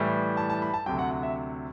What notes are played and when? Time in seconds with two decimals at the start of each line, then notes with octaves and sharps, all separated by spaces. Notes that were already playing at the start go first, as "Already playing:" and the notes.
Already playing: A2 E3 G3
0.37 A5
0.50 A5
0.62 B5
0.74 A5
0.86 D2 C3 F#3 G5
0.99 F#5
1.11 F#5
1.23 E5